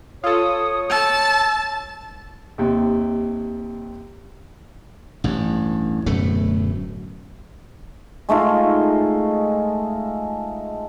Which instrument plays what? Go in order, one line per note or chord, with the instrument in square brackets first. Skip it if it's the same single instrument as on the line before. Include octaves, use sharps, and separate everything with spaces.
[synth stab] F4 A4 [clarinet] C#5 [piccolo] D#6
[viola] A5 [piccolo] E6
[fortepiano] D#2 C3
[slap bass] A1 G2
D1 F#2 B2 A3
[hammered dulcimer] G#3 A3 D#4 F4